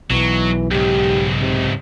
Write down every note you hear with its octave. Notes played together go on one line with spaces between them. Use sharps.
B1 E3 F#3
C#2 G#2 G4
C3